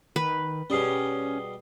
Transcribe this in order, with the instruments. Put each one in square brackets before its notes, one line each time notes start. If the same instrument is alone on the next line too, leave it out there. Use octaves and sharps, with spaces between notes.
[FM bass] D#3 [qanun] B4
[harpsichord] B2 G3 [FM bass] C#4 [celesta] G#4 D#6 C7